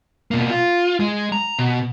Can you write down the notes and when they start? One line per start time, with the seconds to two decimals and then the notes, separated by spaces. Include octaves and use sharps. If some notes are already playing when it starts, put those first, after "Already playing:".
0.31 B2 A#3
0.50 F4
1.00 G#3
1.32 A#5
1.59 B2